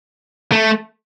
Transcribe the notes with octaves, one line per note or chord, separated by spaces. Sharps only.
A3